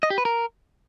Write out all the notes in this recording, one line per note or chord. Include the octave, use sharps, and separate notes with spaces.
D#5
G4
B4
A#4